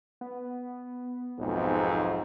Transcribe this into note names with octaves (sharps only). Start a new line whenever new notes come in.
B3
B1 F2 G#2